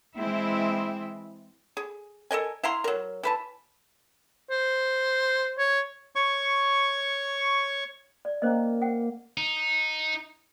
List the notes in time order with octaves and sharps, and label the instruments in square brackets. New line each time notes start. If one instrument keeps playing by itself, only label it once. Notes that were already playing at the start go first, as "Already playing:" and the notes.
[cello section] E3 G#3 C4 E4 E5
[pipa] G#4
A4 A#4 D#5 G#5
E4 F5 A#5 C6
F#3 A#4
E3 B4 A5
[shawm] C5
C#5
[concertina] C#5 C#6
[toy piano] D5
[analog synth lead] A#3 [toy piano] C#4 C5 D#5
[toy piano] C5 F#5 G5
[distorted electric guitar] D#4